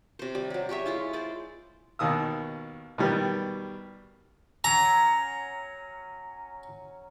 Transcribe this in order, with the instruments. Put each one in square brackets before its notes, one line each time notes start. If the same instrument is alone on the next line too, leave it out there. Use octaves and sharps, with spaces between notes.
[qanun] C3 C5
G3
F#3 G3
G4 G#4 C#5 E5
G#3 E4 F4
G#3 C5 D5
[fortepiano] D#2 B2 D#3 D#6 E6
B2 D#3 G3 G4 B4
[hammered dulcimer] F#3 C#4 [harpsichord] A#5